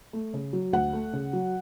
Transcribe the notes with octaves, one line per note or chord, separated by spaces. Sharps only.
A3
C#3
F#3
D2 F#5
A3
C#3
F#3